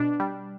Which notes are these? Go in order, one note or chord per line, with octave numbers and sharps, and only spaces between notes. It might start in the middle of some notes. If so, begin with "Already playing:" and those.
Already playing: B2 D4
G3